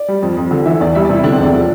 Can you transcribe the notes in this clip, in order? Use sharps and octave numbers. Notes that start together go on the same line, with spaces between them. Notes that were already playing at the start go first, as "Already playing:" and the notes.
Already playing: D5
G3
F2
F2
D3
E3 E5
E2 D5
G3 E5
D5
C3 E4
D3 D4
C4
E1 D4
F3